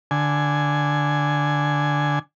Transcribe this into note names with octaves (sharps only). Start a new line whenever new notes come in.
D3 G#5